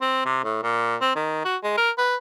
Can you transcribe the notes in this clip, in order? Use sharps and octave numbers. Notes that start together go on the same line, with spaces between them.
C4
C3
A2
A#2
C4
D#3
F#4
G#3
A#4
B4